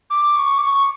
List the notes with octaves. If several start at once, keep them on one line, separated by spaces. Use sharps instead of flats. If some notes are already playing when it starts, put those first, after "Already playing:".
D6
C#6
D6
C#6